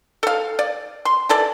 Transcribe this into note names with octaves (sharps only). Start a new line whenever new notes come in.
A4 F5
D5
C6
E3 A4 D5